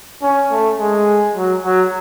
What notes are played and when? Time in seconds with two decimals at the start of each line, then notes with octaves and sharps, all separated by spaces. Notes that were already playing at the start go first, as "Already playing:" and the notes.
0.22 C#4
0.51 A3
0.78 G#3
1.35 F#3
1.64 F#3